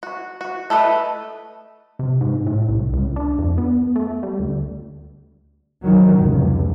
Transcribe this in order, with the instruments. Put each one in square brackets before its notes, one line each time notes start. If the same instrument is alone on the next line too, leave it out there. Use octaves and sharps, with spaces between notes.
[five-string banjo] F#4
F#4
A3 A4 B4 D#5
[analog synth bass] C3
G#2
A2
C2
C#2
D4
F2
B3
A3
G3
D2
[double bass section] D#3 F#3
F1 C#2